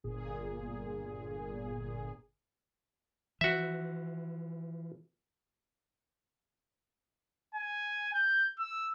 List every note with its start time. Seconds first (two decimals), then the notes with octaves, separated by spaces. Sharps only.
0.04 G1 A#2 G#4
3.41 E3 F3 F#4 E5
7.55 G#5
8.14 G6
8.59 E6